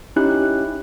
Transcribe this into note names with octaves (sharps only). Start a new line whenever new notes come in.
C#4 D#4 E4 G4 F#6